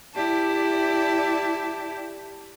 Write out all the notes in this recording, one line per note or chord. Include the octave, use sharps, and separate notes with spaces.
E4 G4 D5 A5